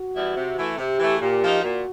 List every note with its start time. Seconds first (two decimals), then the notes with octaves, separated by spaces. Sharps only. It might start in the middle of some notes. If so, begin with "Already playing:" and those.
Already playing: F#4
0.15 E3 G3 B3 E4
0.35 C3
0.57 E3 A3
0.77 C3 G4
0.99 E3 A3
1.20 A#2 G4
1.41 F3 A#3 D#4
1.62 A#2 F#4